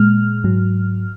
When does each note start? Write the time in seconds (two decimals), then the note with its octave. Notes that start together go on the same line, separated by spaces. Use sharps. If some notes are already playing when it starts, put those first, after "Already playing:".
Already playing: A#2 G#3 F6
0.44 G#2 F#3